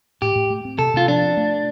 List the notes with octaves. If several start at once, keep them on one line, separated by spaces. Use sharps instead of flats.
A2 G4
A2
A3
C4
C3 A4
C3 F4
F3 D4
C4
A3